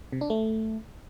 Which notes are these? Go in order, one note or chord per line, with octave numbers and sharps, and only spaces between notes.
C3
D4
A3